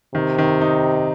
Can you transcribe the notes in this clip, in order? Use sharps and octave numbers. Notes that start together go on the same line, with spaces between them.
C3 D#3
D#3
D#4